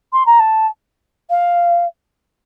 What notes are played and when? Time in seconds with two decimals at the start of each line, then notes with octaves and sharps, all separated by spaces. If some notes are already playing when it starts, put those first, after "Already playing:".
0.12 C6
0.26 A#5
0.39 A5
1.30 F5